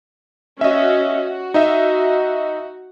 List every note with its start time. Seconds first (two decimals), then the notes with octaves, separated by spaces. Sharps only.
0.61 C#4 F#4 D#5 E5
1.18 F#4
1.54 D#4 D#5 E5